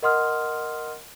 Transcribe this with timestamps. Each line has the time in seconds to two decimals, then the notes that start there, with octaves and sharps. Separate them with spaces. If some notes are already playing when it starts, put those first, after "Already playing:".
0.03 A#4 D#5 F#5 C6 D#6 F6